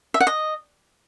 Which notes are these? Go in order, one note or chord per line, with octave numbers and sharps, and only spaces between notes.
E5
F#5
D#5